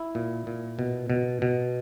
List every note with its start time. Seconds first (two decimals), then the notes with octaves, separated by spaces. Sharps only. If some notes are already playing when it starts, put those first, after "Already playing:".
Already playing: E4
0.15 A#2
0.47 A#2
0.79 B2
1.10 B2
1.42 B2